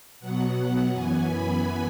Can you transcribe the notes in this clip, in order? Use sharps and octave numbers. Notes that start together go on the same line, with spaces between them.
B2 F#3 B3 F#5
F#2 E3 B3 G#5
B5